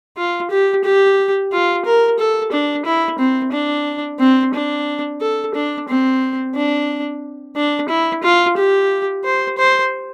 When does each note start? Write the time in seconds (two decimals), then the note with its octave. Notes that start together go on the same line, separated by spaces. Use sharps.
0.17 F4
0.51 G4
0.84 G4
1.52 F4
1.85 A#4
2.19 A4
2.52 D4
2.85 E4
3.19 C4
3.53 D4
4.20 C4
4.54 D4
5.21 A4
5.55 D4
5.89 C4
6.55 D4
7.56 D4
7.89 E4
8.23 F4
8.57 G4
9.24 C5
9.58 C5